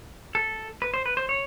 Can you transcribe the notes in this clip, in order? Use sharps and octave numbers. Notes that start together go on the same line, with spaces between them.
A4
B4
C5
B4
C5
C#5